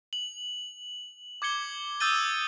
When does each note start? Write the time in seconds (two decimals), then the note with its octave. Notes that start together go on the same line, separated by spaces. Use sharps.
0.13 F#7
1.42 D6 G#6 C#7 G7
2.00 D#6 E6 G6 A6 D#7 G7